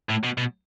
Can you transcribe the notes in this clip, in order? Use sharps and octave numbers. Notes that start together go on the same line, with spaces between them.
A2
B2
B2